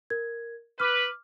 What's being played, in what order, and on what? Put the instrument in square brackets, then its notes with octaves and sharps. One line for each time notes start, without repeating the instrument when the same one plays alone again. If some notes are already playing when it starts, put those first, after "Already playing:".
[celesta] A#4 G#6
[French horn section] B4 [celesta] D6 F6